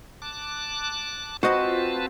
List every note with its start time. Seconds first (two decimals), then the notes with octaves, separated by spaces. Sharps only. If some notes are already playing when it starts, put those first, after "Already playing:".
0.22 A5 D6 F#6
1.43 C4 F4 F#4 B4 C5 D#5 A5 B5